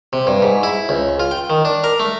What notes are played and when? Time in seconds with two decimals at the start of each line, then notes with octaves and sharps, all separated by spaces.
0.13 C3
0.27 G2
0.42 G#2
0.63 E4
0.89 C#2
1.20 F4
1.31 G5
1.50 D#3
1.65 D4
1.84 A#4
2.00 A3